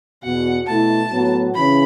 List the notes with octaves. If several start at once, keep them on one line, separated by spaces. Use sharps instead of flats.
E2 B2 B3 F#4 F#5
B2 A3 E4 A5
A2 F#3 B3 F#4
C#3 E3 C#4 B5